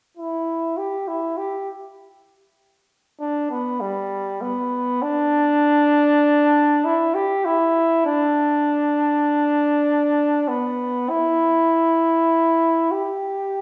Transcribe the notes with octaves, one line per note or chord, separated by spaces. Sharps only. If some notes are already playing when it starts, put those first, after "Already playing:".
E4
G4
E4
G4
D4
B3
G3
B3
D4
E4
G4
E4
D4
B3
E4
G4